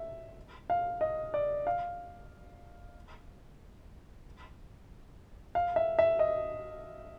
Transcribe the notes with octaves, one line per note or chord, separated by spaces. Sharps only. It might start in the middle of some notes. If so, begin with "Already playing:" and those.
Already playing: E5
F5
D#5
D5
F5
F5
E5
E5
D#5